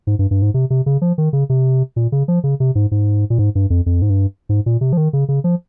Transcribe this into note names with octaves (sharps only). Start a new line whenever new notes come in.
G#2
G2
G2
G#2
C3
C3
C#3
F3
D#3
C#3
C3
A#2
C#3
F3
C#3
C3
G#2
G#2
A#2
G#2
G2
F2
F2
G#2
G2
G#2
A#2
C3
F3
D#3
C#3
C#3
F3